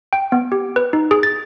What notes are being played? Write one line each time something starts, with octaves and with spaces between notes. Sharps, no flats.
G5
B3
G4
B4
D#4
G#4
A6